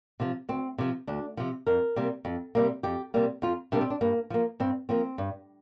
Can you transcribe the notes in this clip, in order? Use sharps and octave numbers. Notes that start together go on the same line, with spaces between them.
C3 F3
D2 C4
C3 F3
D2 D4
C3 F3
F2 A#4
C3 G3 A#3
F2
C3 G3 A#3
F2 G4
C3 G3 A#3
F2 F4
C3 G3 A#3 D4
C4
D4
G2 A#3
F3 A#3
G2 C4
F3 A#3 C4
G2